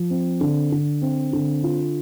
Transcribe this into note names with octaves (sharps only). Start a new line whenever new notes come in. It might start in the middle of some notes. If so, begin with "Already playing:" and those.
Already playing: F3
C4
D3
D3
C4
D3
F4